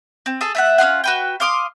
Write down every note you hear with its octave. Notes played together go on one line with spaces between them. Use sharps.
C4
G#4 A4 A5
A3 E5 F#5
C#4 E4 F4 F#5
F#4 B4 G5
F5 C6 D6 D#6